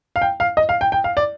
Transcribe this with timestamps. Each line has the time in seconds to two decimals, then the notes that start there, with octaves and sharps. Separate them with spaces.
0.16 F5
0.22 G5
0.40 F5
0.57 D#5
0.69 F5
0.81 G5
0.92 G5
1.04 F5
1.17 D5